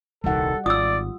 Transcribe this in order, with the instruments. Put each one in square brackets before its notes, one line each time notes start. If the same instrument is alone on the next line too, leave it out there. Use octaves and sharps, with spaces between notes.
[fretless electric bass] D#1 C2 D#3 [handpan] G3 F#5 [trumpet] A4
[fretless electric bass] G#1 [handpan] F4 [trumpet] D5 [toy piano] D#6 E6